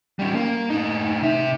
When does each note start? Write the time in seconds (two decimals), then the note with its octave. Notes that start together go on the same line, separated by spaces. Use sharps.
0.19 G3 C#4
0.35 A#3
0.70 A2 D#4
1.22 C3 E5